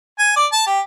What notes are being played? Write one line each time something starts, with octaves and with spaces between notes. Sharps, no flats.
G#5
D5
A5
G4